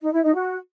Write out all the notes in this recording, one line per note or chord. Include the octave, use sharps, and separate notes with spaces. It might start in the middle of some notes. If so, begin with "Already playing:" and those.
D#4
E4
D#4
F#4